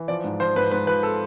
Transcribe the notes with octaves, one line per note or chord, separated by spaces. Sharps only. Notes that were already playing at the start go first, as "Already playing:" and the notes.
Already playing: E3
F3 D5
G#2
F3 C5
G#2 B4
G#2 B4
F3 B4
A4